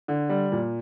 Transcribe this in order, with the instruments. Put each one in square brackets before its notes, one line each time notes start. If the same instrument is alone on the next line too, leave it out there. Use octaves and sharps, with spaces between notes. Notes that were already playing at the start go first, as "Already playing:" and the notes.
[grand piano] D3
G3
A#2